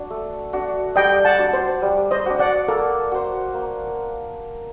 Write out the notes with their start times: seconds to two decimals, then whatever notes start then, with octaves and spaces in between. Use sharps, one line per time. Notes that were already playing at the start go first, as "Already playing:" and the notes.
Already playing: D4 F#4
0.11 A3
0.53 D4 F#4
0.96 G3 D#5 G5
1.25 F#5 A5
1.39 D4 F#4
1.53 C5
1.82 G3
2.11 C5 D#5
2.26 D4 F#4
2.39 D5 F#5
2.68 A#3 A4
3.12 F#4 C5
3.54 A#3